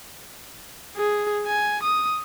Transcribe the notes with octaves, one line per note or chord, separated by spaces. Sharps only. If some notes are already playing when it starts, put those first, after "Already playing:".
G#4
G#5
D#6